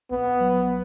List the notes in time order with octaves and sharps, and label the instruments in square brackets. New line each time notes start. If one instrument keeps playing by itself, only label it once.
[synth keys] A#1 [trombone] B3
[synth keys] F#3